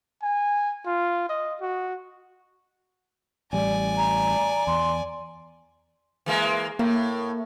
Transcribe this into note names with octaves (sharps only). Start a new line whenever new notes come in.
G#5
F4
D#5
F#4
A1 G3 D5 G#5
A#5
E2 C6
E3 G#3 A#3
A2 A#3